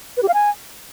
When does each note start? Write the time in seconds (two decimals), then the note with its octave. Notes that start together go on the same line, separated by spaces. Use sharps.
0.17 B4
0.23 G4
0.28 F5
0.34 G#5